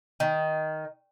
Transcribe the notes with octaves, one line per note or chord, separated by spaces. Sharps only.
D#3